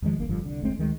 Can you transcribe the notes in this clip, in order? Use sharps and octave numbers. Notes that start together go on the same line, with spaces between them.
E2 D#3 F3 G#3
D1 G1 D2 A#3
F1 G2 D3 F3
C2 D3
F1 D2 G#3 C4
D2 D#3 G#3